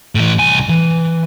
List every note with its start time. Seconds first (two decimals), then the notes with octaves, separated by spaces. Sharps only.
0.15 A2 E3
0.38 C2 G#5
0.69 E3